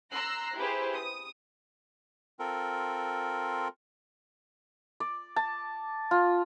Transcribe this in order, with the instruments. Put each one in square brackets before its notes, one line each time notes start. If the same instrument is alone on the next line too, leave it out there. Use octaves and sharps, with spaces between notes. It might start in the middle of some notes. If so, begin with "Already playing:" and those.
[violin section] A#5 C6 E6 F#6 A#6 C7
E4 G4 G#4 B4 C5
D#6
[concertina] C4 F4 A4 A#4
[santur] D5
A5
F4